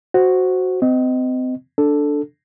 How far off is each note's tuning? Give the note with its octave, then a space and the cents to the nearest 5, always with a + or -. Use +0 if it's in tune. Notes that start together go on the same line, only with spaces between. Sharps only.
F#4 +0 C5 +0
C4 -35 D#5 +0
D4 +0 A4 +0